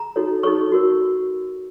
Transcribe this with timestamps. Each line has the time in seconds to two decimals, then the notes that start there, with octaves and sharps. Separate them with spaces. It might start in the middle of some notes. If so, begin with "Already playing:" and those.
Already playing: A#5
0.16 D#4 F#4 A4 C#5
0.43 D#4 F#4 A4 C#5 C#6
0.72 F#4 A#4 C#5